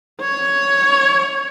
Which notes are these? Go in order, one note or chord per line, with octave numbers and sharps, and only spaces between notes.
C#5